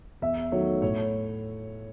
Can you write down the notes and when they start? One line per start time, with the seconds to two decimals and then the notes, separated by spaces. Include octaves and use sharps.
0.22 E2 E5
0.52 D#3 F#3 A3 C#5
0.82 A2 C#5